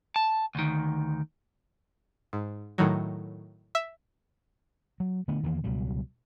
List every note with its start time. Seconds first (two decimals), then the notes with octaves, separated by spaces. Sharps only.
0.16 A5
0.55 D2 D#3
2.33 G#2
2.78 A2 D#3 F#3
3.75 E5
5.00 F#3
5.28 D3 A3 B3
5.43 E2 D#3 E3 A#3
5.64 C#2 B2 F#3 G3